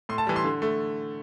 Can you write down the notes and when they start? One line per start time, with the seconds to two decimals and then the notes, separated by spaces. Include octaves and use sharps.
0.09 A2 C6
0.18 A5
0.27 E3 G3
0.36 C6
0.44 D3
0.62 A3